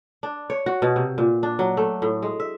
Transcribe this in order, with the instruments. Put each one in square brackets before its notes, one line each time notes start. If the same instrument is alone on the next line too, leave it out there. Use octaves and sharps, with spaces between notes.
[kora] D4
C#5
F#4
B2
C3
A#2
D4
F#3
A3
A2
G#3
E5